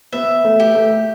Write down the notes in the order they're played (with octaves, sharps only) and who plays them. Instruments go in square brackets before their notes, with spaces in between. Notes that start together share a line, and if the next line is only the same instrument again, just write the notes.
[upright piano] B3 [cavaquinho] E5
[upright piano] A3
[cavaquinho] G4
[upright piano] A3